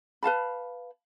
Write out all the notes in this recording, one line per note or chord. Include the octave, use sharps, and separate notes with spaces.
B4 F5 A5 B5